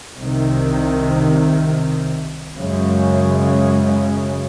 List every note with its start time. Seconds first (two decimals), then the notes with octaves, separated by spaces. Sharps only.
0.17 C2 C3 D#3
2.55 F#2 C#3 G#3